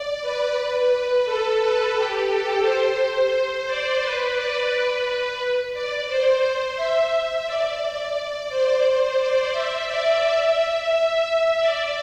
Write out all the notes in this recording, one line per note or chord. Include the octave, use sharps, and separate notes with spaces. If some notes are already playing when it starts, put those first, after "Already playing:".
Already playing: D5
B4
A4
B4
G4
A4
C5
C5
D5
B4
D5
B4
D5
C5
E5
E5
D5
C5
D5
E5
D5
E5
D5